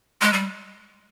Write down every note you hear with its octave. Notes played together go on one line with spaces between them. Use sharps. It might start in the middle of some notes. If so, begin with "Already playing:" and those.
G#3
G3